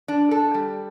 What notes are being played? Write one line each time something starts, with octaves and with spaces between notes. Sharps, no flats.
D4
A4
G3